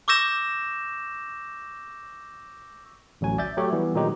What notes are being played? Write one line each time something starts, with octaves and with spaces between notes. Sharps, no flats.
C#6 D6 E6 G6 A#6 E7
A1 D2 F#3 G#5
D5 E5 G6 A6
F#3 A3 G4 C#5
E3 G3 B3
A#2 D#3 F#3 G#3 D#4 G4